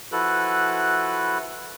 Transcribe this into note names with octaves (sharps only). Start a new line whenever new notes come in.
F3 E4 F#4 A4 B4 F#6